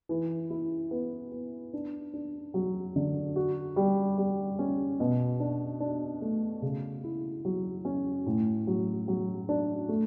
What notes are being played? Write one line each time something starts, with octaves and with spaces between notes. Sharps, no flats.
E3
E4
B3
B3
D4
D4
F#3
D3
F#4
G3
G3
C#4
B2
D4
D4
A3
C#3
E4
F#3
C#4
A2
F#3
F#3
D4
A3